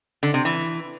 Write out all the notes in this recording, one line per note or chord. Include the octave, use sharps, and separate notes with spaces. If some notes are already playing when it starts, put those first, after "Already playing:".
D3
C3
E3